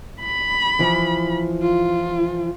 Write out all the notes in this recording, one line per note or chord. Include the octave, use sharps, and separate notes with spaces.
B5
E3 F3
F4